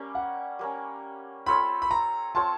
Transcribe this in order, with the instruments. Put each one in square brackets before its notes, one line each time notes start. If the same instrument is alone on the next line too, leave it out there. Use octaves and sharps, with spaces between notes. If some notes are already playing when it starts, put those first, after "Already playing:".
Already playing: [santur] G3 A#3 C#4
[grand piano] F#5
[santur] G3 A#3 C#4
[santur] C4 F4 A4 C#5 [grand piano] B5
[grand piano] B5
A#5
[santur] C4 F4 A4 C#5 [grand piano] A5